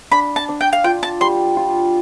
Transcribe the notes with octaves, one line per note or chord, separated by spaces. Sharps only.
D4 B5
A5
D4
G5
F5
F4 G5
A5
G3 C6
F4